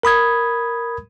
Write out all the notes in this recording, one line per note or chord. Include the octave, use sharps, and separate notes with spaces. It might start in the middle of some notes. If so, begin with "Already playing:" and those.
A#4 B5 D#6 G#6